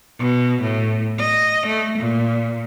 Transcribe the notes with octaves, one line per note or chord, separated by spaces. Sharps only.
B2
A2
D#5
A3
A#2